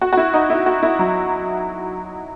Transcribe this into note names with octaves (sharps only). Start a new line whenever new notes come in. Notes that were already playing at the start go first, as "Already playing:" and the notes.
F#4
F#4
E4
D#4
E4
F#4
E4
F#3